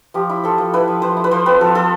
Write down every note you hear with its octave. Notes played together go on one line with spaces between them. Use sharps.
F3 G4
E4
F3 A4
F3
E4 B4
F3
F3 C5
E4
B4
F3 C5
C4 B4
F3 A4
F3 A4